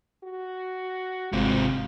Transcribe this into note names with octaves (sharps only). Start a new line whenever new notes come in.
F#4
G#1 G#2 C3 G#3 F4